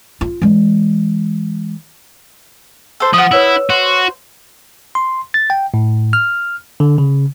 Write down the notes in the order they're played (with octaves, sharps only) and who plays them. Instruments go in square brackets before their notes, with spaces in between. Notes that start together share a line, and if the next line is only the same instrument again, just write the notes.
[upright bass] F4
E3 G#3
[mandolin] A4 C5
[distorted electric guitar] F3 [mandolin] F#5 D#6
[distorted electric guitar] E4 [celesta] B4 C#5 E6
[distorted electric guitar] F#4 [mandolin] C5
[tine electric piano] C6
A6
G5
A2
F6
D3
C#3